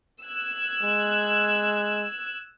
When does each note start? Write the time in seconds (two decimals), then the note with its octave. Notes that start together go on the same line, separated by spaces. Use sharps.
0.22 E6 F#6 G#6
0.83 G#3